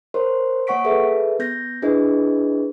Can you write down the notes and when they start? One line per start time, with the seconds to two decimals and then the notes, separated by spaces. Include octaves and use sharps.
0.14 A#4 C5 C#5 C6
0.67 A#3 C#5 F#5 C#6 B6 D7
0.85 G#4 A4 B4 E5
1.39 B3 G6 A#6
1.82 D4 E4 G#4 B4 D#5